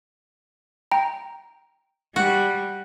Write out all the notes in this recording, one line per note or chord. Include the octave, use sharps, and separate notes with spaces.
G5 A#5
G3 F#4